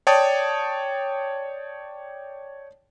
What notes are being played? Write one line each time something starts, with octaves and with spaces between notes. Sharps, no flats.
C#5 D5 G5 A5 D#6